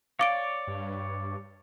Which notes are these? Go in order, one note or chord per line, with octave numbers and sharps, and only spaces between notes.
C#5 D5 F5 D6 D7
G2